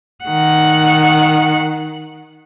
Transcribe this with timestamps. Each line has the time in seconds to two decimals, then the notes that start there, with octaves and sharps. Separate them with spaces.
0.24 D#3 F#5